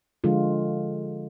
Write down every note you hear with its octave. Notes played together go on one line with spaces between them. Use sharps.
D3 F3 G#3 F4